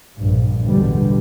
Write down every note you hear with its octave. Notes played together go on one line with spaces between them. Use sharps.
A#1 G2
A1 E2 B2 D3 G3